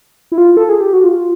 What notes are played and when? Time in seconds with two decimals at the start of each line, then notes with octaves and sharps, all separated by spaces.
0.32 E4
0.38 F4
0.57 A4
0.69 G#4
0.81 G4
0.93 F#4
1.04 F4